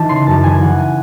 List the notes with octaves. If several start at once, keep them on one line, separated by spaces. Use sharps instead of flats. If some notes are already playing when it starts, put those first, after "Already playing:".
Already playing: E3 D#4 A5
C#3 C6
F#2 A5
E3 G#5
E3 F#5
G#5